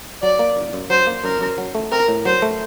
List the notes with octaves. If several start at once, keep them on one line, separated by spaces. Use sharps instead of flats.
F#3 D5
A#3
F#2
F#2
F#3 C5
A#3
F#2 A#4
F#2
F#3
A3
C4 A#4
A2
F#3 C5
A3